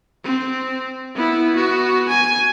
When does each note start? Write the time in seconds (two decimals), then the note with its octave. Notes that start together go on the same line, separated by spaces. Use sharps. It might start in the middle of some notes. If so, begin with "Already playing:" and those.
0.24 C4
1.15 B3 E4
1.56 B3 F#4
2.08 G#5